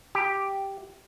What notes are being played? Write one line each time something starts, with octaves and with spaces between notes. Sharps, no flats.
G4